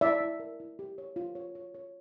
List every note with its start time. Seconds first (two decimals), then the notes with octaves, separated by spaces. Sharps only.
0.01 E4 D5 E5
0.20 E4
0.40 A#4
0.60 E4
0.79 G4
0.98 C#5
1.16 F4
1.35 C#5
1.55 C#5
1.74 C#5